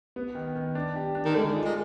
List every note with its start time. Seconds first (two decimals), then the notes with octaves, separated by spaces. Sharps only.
0.16 B3
0.35 D#3
0.55 D#3
0.75 D4
0.96 G4
1.15 D4
1.25 D#3
1.35 D3 G#3
1.56 F4
1.65 G#3